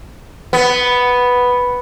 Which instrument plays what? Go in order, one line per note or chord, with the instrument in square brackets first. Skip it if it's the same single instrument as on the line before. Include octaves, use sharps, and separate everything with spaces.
[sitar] B3